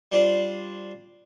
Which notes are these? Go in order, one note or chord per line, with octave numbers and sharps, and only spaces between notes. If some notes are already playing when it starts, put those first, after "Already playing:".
G3 D4 F4 C5 D5